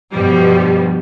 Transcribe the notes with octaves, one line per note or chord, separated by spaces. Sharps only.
G2 B2 F3 G3